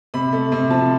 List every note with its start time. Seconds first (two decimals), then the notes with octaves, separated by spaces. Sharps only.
0.14 C3 B5
0.33 A3
0.52 C3
0.70 F3 A5